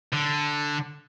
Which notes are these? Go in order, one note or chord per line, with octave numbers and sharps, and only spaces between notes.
D3